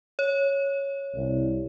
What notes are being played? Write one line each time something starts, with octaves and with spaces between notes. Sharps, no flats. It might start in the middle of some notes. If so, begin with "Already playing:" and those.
C#5
C2